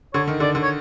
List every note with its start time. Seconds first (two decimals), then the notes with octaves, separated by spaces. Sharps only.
0.14 D3 C#5
0.28 D#3
0.40 D3 D5
0.55 D3
0.62 C#5